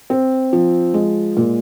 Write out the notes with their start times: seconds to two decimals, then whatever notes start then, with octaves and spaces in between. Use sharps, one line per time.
0.10 C4
0.53 F3
0.94 G#3
1.37 A#2